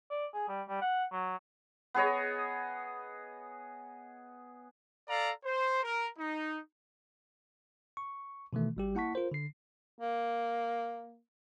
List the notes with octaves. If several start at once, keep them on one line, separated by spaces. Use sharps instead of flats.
D5
G#4
G3
G3
F#5
F#3
B3 G#4 C#5 D#5
A4 D5 F5 A#5
C5
A#4
D#4
C#6
B2 D#3 E3 A3
G#1 G3 G4
A#3 E4 F#5 A5 C#6 B6
F4 A#4 C5
D3 C7
A#3